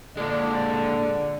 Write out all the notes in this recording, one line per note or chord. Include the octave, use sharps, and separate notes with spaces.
A#2 D3 G#3 D5